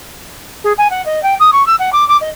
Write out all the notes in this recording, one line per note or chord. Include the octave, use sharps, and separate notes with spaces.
G#4
G#5
F#5
D#5
G5
D#6
C#6
E6
F#5
D6
D6
D#5